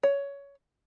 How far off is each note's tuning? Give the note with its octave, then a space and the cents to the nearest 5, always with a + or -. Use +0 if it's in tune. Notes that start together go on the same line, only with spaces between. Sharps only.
C#5 +15